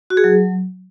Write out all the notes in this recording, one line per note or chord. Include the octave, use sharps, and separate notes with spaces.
F#4
G#4
F#3